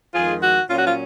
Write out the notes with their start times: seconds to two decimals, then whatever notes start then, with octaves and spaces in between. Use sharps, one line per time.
0.14 F2 D#3 G#3 F4 G#4
0.41 F#4
0.68 A#2 F#3 C#4 F4
0.77 F#4
0.86 F4